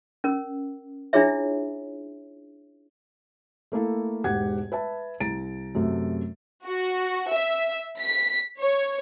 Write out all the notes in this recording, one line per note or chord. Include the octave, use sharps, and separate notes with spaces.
C#4 A#4
D4 E4 F4 G#4 C#5 E5
A3 A#3 E4 A4
E1 G#2 G4 F#5 G#6
B4 E5 A5
C2 A#5 A6 D7
F#2 C3 A3
F#4
E5
B6
C#5